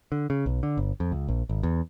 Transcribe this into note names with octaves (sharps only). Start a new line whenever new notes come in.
D3
C#3
B1
D3
G1
F2
C#2
A#1
G#1
E2